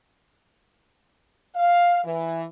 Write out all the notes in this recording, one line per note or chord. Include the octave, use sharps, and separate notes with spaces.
F5
E3